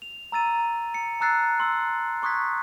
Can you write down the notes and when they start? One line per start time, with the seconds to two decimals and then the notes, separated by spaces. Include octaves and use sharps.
0.02 F7
0.32 A#5 E6 A6 D#7
0.94 C#7
1.20 A5 A#5 E6 F#6 A6 C7
1.60 C6 E6
2.22 C6 C#6 D#6 F#6 G#6 B6